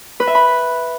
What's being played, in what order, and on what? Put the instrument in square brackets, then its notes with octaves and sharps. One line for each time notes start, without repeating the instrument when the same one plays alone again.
[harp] B4
E5
B5